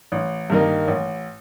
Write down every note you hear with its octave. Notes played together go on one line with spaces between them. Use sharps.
A1
G2 D#3 A#3 D#4
A1